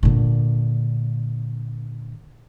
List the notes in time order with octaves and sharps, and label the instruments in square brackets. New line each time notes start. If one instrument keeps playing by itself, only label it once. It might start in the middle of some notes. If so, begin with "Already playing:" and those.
[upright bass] A#2 D3